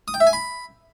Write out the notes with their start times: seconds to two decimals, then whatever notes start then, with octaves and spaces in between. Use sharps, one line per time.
0.08 D#6
0.14 G5
0.20 E5
0.27 G#5
0.33 B5